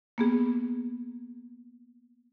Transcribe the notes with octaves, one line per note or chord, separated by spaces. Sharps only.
A#3 B3 G#4